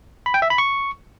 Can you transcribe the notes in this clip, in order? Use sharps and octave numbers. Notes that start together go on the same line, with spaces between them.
B5
G5
E5
B5
C#6